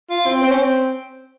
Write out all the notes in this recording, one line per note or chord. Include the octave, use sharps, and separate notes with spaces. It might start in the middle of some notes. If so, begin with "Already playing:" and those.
F4
C4
C4
C#4
C4